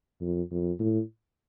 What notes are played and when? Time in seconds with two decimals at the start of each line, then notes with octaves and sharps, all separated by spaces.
0.21 F2
0.51 F2
0.79 A2